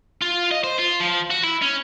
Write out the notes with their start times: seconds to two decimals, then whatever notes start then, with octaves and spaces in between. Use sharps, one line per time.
0.22 F4
0.51 D#5
0.64 C5
0.79 F4
1.01 F3
1.30 F#4
1.43 E4
1.62 C#4